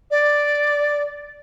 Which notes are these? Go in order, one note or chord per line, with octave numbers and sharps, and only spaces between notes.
D5